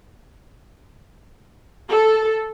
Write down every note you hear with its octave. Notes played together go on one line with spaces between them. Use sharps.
A4